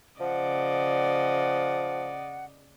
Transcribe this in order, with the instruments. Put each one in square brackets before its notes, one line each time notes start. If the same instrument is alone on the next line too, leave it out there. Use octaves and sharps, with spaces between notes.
[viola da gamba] C#3 D5 D#5 [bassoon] F3 [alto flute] F#5